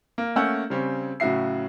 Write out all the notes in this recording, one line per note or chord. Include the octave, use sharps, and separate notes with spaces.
A#3
A3 A#3 C#4 F#5 E6 G6
C#3 G3 C4 C#4
A2 C#3 F#3 F#4 E5 C7